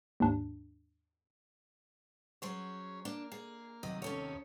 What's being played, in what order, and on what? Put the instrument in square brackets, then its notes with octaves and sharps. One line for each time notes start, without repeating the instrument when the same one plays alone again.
[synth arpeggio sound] D#2 G#2 D4
[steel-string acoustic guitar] F#3 G#4 C5 [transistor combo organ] C#4 C#5
[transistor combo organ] A#3 [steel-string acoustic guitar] D4
[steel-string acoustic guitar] G#4
[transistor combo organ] D#2 C3 D#6 [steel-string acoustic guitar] F#3 D#5
[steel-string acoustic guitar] C#4 A4 C#5